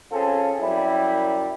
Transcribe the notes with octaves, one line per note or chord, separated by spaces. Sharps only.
C4 C#4 F4 G#4 A4
F#2 F#3 G3 E4